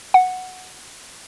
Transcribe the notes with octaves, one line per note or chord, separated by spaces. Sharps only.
F#5